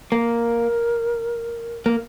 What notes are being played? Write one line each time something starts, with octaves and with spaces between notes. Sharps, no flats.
A#3 A#4
A#3